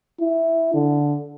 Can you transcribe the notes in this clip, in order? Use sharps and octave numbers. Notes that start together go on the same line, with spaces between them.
E4
D3